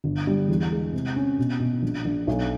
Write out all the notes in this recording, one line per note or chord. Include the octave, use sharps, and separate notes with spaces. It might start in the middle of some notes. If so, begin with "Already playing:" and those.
G1
G3
E2
G#3
C3
C#4
B2
B2
A#1
A#1
B1